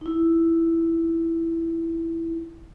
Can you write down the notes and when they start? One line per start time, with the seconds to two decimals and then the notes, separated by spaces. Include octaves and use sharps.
0.01 D#4 E4